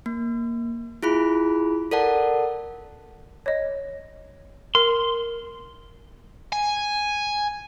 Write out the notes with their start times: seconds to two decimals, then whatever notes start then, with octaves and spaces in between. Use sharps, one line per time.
0.06 A#3
1.03 E4 F4 G#4 B5
1.91 A4 A#4 D5 F#5 A5
3.46 C#5 D#5
4.75 A#4 C6
6.52 G#5